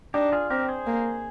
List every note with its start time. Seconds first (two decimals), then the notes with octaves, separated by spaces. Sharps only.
0.14 D4 D#4 G4
0.32 F4 G#4
0.50 C4 G4 A#4
0.68 G#4 C5
0.87 A#3